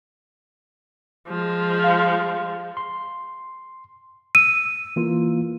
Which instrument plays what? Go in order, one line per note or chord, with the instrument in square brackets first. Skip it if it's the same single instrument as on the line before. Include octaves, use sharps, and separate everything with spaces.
[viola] F3 G#3
[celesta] F5
[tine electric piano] C6
[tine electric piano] E6 [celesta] D#7
[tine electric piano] E3 A#3 F4